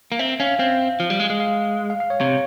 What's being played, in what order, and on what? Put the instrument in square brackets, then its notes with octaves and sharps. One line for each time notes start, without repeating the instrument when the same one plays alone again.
[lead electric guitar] A#3
[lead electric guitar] C4 [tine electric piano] E5
[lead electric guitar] C#4 [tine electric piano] F5
[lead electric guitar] C4 [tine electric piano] F5
[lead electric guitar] F3
G3
G#3
G#3
[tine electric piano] F5
F5
F5
C#5
[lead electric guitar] C3 [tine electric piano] C#5